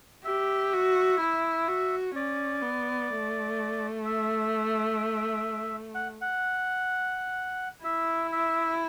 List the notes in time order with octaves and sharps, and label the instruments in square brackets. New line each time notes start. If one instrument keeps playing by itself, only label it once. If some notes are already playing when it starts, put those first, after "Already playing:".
[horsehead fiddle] G4 [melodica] E5
[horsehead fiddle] F#4
E4
F#4
[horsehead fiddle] C#4 [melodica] D5
[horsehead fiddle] B3
A3
[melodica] E5
F#5
F#5
[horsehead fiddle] E4 [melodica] E5
[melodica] E5